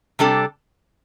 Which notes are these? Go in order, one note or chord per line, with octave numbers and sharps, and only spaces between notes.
C3 G3 D4 A4